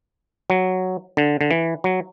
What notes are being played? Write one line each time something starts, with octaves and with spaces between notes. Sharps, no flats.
F#3
D3
D3
E3
F#3